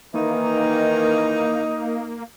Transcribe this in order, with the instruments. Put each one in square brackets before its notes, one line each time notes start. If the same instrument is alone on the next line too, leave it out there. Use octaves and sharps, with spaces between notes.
[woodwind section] D#3 E3 [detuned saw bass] A#3 [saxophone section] D#4